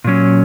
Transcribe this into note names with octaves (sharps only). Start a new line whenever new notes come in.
A#2 F#3 C#4